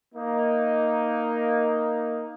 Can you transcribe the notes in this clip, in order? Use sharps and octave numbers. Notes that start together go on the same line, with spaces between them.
A#3 D#4